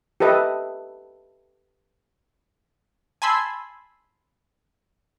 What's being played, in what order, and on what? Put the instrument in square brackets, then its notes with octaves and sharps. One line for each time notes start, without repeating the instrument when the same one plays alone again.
[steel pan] G4 A4 B4 D#5 E5
[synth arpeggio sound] G#5 A5 B5 C6 E6 G#6